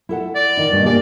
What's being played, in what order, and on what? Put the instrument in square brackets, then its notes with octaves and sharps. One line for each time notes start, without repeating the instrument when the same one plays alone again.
[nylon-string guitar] E4 A4 F#5
[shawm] D5
[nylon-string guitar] D#3 D#4
G2 B2 A#3
[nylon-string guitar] A#3 G4 G#4 [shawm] D5